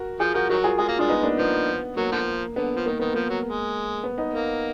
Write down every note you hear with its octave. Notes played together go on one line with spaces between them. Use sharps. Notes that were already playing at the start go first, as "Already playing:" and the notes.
Already playing: F#4 A#4
F3 F4 G#4
F3 F#4 A#4
D#3 F#3 F#4 A#4
F4 G#4
G#3 F4 G#4
A#3
G#3 D4 F4
B3 D#4
A#3 D4
F3 B3
F#3 A#3
D3 F3
D3 B3
F3
D#3 A#3
D#3 B3
F3 A#3
F#3
G#3
B3
B3 D#4
A#3